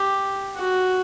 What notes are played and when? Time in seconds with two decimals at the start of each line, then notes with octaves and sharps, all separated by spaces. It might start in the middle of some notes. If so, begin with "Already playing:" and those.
Already playing: G4
0.56 F#4